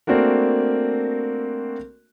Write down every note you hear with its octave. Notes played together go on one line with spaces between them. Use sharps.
A3 A#3 C4 D4 F#4 A#4